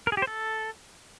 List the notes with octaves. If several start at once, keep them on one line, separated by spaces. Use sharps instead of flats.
A#4
G#4
G4
C5
A4